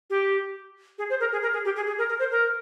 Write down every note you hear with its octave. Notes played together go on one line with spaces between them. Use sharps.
G4
G#4
C5
A#4
G#4
A#4
G#4
G4
G#4
G#4
A#4
A#4
C5
A#4